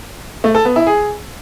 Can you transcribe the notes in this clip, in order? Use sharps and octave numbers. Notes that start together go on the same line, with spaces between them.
A3
A4
B3
E4
G#4